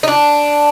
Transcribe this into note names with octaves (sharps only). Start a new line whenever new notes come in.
D#4
D4